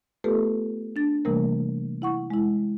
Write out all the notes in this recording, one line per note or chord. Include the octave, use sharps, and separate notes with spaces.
A3 B3 F4 G4 A4 B4
D4 A6
C3 E3 G3 A3 A#3 A#4
E4 F#5 C#6
G#3 E4